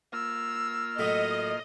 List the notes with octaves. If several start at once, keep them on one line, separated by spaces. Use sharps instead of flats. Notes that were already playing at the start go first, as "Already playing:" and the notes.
A#3 F4 E6 F6
A2 F#3 A3 D#5